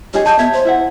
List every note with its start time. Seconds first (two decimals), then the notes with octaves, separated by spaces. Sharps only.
0.13 C#4 D#4 G4 G#4
0.26 D#5 A5 G6 D#7
0.39 B3 C#5 E5 G#6
0.53 C5
0.65 E4 E5 F#5